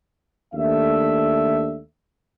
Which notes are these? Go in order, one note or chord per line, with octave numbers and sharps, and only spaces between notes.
D#2 A3 D4 E5